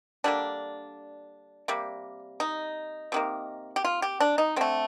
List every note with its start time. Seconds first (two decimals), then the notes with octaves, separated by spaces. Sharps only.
0.24 D3 G3 A#3 D4
1.68 C3 G3 A#3
2.40 D#4
3.12 C3 D#3 A#3
3.76 G4
3.84 F4
4.02 G4
4.20 D4
4.38 D#4
4.56 D3 A3 C4